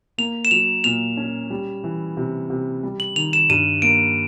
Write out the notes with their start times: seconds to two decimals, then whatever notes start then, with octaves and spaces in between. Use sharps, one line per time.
0.18 A#3 F7
0.45 E7
0.51 F#3 F7
0.84 A#2 F7
1.17 C#4
1.50 G3
1.84 E3
2.17 C3
2.50 C3
2.83 G3
3.00 F#7
3.16 D#3 F7
3.33 E7
3.50 G2 D#7
3.82 A#3 D7